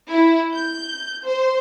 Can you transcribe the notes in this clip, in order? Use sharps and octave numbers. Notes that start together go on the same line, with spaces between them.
E4
G6
C5